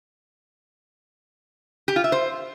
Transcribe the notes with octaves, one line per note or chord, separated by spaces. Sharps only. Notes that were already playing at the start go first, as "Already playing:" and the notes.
G4
F4
E5
C5